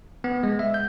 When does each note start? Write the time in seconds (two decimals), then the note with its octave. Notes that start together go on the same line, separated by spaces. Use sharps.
0.24 B3
0.43 G#3
0.59 E5
0.74 G6